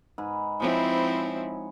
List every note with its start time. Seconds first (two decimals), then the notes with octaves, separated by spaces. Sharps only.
0.18 G#2 B4
0.60 F3 G#3 C4 E4 B4 C#5